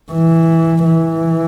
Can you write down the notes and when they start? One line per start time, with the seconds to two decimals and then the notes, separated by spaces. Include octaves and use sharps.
0.12 E3
0.85 E3